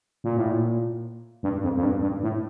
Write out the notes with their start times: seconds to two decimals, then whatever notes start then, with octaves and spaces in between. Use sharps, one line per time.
0.24 A#2
0.37 A2
0.50 A#2
1.43 G2
1.63 F2
1.77 F2
1.83 G2
2.02 G2
2.23 A2